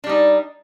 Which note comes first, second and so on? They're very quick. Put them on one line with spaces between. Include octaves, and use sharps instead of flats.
D4 G3 D#4